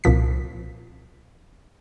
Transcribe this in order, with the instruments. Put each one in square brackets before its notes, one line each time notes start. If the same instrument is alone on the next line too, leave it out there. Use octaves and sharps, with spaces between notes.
[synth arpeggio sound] C2 A#2 F3 B6